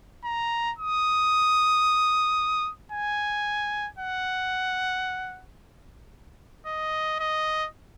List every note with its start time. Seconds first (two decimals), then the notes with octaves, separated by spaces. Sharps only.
0.24 A#5
0.79 D#6
2.92 G#5
3.99 F#5
6.66 D#5
7.19 D#5